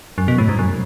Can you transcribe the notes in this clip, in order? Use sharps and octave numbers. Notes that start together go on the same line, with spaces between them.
F#2
B2
A2
G#2
F#2